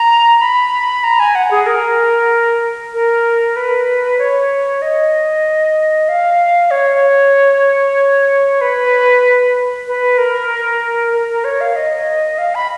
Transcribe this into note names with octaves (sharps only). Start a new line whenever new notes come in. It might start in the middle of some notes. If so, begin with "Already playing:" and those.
Already playing: A#5
B5
A#5
G#5
F#5
G#4
A#4
A#4
B4
C#5
D#5
F5
C#5
B4
B4
A#4
A#4
A#4
C#5
F5
D#5
F5
B5